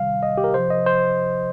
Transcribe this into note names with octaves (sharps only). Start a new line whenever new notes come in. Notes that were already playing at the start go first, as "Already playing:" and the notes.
Already playing: C3 D#3 G3 F5
D#5
G4
A#4
C3 F3 C5
D#5
C5